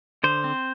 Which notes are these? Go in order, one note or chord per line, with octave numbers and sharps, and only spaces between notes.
D3 C5
C4